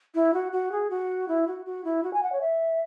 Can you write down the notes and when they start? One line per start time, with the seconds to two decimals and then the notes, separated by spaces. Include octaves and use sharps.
0.15 E4
0.34 F#4
0.52 F#4
0.72 G#4
0.90 F#4
1.28 E4
1.48 F#4
1.66 F#4
1.85 E4
2.04 F#4
2.14 G#5
2.23 F#5
2.32 C#5
2.41 E5